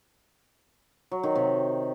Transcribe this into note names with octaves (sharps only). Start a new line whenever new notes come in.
F#3
D#3
C3